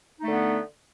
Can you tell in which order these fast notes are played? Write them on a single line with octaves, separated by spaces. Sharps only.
D#4 A3 D3 B3